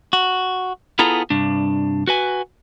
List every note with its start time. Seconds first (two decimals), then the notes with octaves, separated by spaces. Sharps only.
0.13 F#4
0.99 B3 E4 F4 G#4 A4 A#5
1.30 C2 G2 D4
2.07 F#4 B4 G#5